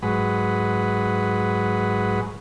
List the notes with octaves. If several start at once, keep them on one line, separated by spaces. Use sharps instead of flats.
G#2 F#3 B4